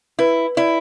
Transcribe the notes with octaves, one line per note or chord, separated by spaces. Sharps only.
E4 B4
E4 D5